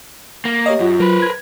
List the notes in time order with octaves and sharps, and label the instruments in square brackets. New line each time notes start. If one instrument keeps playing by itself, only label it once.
[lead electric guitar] A#3
[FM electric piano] G4 C#5 D#5
[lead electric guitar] F#2 [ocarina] F4
[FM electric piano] F#3 [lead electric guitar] A#4 B4
[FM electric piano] G#6